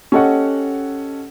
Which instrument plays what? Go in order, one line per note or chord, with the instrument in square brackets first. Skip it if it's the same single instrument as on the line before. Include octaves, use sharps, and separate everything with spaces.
[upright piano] C#4 G4 A4 D#5 F#5 C#6